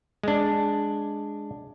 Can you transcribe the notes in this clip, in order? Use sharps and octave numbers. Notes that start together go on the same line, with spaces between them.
G#3 D4